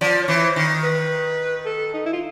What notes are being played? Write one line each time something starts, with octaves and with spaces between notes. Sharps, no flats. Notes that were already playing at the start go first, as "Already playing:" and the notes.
F3 D5
C#5
E3
C5
D#3
B4
A4
D#4
E4
F4